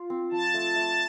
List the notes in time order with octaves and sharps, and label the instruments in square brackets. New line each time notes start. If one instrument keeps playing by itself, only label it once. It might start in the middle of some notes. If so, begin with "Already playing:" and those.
Already playing: [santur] F4
C4
[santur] F3 [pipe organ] A5
[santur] A3
A3